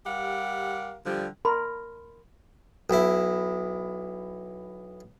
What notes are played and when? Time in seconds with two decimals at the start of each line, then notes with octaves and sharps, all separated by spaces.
0.06 G3 G4 A#4 F5 F#5
1.06 D3 F3 G3
1.45 A#4 B5 C6
2.90 B1 E4